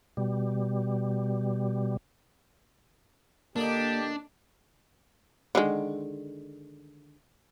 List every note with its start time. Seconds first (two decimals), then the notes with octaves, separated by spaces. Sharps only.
0.17 B2 G3
3.56 A#2 D3 A#3 D4 D#4 G4
5.55 D3 D#3 G#3